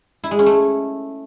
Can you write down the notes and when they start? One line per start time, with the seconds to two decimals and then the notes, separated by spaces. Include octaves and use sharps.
0.24 E4
0.31 G#3
0.39 C#4
0.46 A3